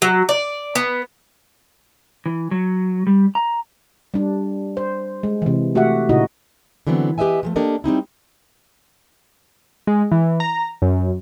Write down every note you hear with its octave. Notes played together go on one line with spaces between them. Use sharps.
F#3
D5
B3
E3
F#3
G3
A#5
G3 D4
C5
G#3
C3 E3
A3 F#4 G4 E5 F#5
A#2 C#3 D#4 E4 F#4 D#5
D3 E3 F#3 B3 C4
G4 B4 D#5 E5 G#5
F3 G#3 A3
A#3 D4 G4 A4 A#4 D#5
G3 C4 D#4 E4
G#3
E3
A#5
F#2